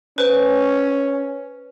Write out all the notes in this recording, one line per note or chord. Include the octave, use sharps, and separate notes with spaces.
C#4 B4 C5